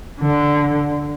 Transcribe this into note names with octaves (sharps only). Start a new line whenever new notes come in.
D3